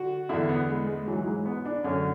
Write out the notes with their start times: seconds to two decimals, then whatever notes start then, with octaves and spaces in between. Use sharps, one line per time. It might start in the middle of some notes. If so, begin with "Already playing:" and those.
Already playing: D3 F#4
0.29 E2 D3 E4
0.49 B3
0.69 G#3
0.87 G#3
1.08 G#2 E3 F#3
1.21 F#3
1.27 G#3
1.46 B3
1.66 D4
1.84 F#2 D3 C#4